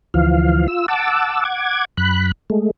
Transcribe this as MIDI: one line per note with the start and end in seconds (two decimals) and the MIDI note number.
0.14 0.67 38
0.14 0.67 52
0.14 0.67 53
0.14 0.67 77
0.68 0.86 65
0.68 0.86 88
0.88 1.44 78
0.88 1.44 81
0.88 1.44 86
0.88 1.44 88
1.45 1.85 78
1.45 1.85 86
1.45 1.85 92
1.97 2.32 42
1.97 2.32 83
1.97 2.32 90
2.50 2.71 56
2.50 2.71 57